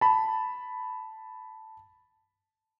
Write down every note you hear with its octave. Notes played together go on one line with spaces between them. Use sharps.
A5 B5